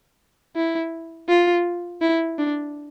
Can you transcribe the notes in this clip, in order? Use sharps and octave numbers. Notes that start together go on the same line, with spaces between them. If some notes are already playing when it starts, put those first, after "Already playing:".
E4
F4
E4
D4